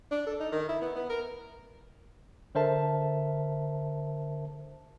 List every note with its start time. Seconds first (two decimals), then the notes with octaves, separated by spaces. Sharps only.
0.11 D4
0.26 A4
0.40 D#4
0.52 D#3
0.69 E4
0.82 B3
0.96 B3
1.10 A#4
2.55 D3 A#4 C5 E5 A5